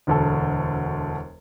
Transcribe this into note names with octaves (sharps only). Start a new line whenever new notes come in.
E1 D2 A4